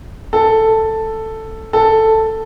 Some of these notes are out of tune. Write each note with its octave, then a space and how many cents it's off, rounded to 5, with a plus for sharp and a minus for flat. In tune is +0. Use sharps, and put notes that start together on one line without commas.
A4 +5
A4 +5